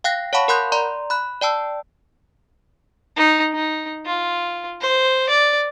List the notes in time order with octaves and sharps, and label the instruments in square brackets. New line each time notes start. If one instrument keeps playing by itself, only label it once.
[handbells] F5 G5 F#6 A#6
C#5 F5 F#5 A5 B5 C#6
A#4 F#5 B5 C6 F#6 G6
D5 A#5 C6
B5 F#6
D5 G5 A5 E6
[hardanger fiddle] D#4
D#4
F4
C5
D5